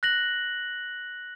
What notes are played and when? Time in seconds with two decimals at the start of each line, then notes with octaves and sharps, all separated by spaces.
0.03 F#6 A#6 F#7